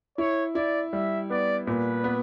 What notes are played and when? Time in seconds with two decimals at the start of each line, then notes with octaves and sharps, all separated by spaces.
0.18 E4 C#5
0.55 E4 D5
0.93 G3 E5
1.30 B3 D5
1.67 A#2 B4
2.04 B3